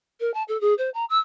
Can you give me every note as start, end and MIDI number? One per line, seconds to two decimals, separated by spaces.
0.20 0.33 70
0.34 0.43 81
0.48 0.59 69
0.61 0.74 68
0.78 0.90 72
0.94 1.05 82
1.09 1.18 88